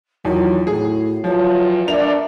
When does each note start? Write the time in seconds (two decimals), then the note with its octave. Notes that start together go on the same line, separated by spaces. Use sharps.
0.25 E2 D#3 F#3 F4
0.67 A2 F#4 G#4
1.24 E2 F3 F#3 F4 C#5
1.87 B2 A3 D4 A#4 D5 E5 F7